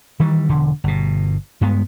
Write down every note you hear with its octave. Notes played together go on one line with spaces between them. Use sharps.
D#3 E3 G3
E1 D3
G1 B2
G2 G#3 B3